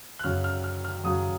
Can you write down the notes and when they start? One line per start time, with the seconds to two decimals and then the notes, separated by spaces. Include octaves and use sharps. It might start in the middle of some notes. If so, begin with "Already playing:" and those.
0.19 F#6
0.24 F#2 C#3 F#3 F6
0.44 F6
0.64 F6
0.84 F6
1.04 F#2 C#3 F#3 D#6